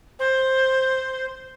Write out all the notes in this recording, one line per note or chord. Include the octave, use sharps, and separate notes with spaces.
C5